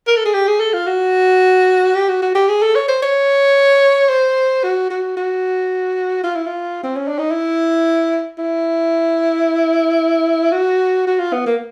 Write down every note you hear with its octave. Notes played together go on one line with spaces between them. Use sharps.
A#4
A4
G#4
G4
G#4
A4
F4
F#4
G4
F#4
F#4
G4
G#4
A4
C#5
C5
C#5
C5
F#4
F#4
F#4
F4
E4
F4
C4
C#4
D4
D#4
E4
E4
F#4
F#4
F4
B3
A#3